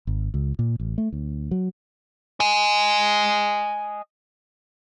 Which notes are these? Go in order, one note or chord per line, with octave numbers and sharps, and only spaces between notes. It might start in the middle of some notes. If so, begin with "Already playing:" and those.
G#1
C#2
A#2
A1
A3
D2
F#3
D#5 G#5